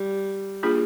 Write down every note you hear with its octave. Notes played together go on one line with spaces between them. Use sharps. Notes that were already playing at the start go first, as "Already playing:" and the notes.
Already playing: G3
A#3 D4 F4 G#4